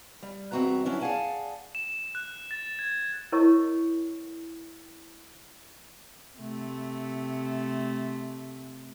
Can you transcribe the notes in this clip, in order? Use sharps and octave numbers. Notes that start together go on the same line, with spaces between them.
G3
E2 G2 C4 F#4 E5 A#5
F#3 C#4 D4 E4
G#4 D5 F5 F#5 G#5 A5
E7
F#6
A6
G#6
E4 A#4 C#5 D#5 A#5 C#6
C3 A3